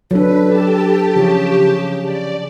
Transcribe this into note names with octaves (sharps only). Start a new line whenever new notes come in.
F#3 D4 A4 B4
G4 A5
C#3 F3
C#3
D5